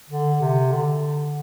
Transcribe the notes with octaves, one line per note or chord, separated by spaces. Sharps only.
D3
C3
D3